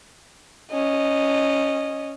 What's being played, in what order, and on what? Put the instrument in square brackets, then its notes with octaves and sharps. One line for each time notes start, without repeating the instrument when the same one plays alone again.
[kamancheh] C#4 D#5